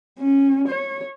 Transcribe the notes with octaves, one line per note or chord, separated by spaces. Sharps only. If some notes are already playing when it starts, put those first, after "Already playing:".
C#4
C#5